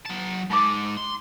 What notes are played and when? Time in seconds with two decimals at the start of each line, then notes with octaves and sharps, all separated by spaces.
0.05 F#3 A5
0.50 G#2 G#3 A5 A#5 D6
0.97 C6